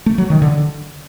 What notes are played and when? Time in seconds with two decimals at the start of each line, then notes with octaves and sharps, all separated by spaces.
0.06 A3
0.18 F#3
0.30 D#3
0.42 D3